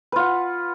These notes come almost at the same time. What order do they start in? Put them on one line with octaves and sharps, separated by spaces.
B4 F4 F#5